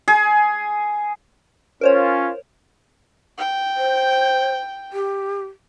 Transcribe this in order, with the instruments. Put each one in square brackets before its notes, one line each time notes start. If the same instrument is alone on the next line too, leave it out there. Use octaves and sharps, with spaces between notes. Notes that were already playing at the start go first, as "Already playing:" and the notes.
[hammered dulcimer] G#4
[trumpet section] C#4 F4 [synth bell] A#4 C5 C#5
[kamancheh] G5
[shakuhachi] C5
G4